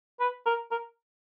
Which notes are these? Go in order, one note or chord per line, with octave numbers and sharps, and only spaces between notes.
B4
A#4
A#4